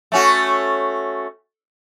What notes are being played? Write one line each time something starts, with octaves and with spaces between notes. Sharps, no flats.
A3 C#4 F#4